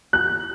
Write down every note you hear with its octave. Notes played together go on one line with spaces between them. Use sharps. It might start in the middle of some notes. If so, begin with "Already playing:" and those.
F#6